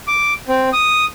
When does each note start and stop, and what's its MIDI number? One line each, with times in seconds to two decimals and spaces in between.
0.07 0.34 86
0.48 0.69 60
0.73 1.05 87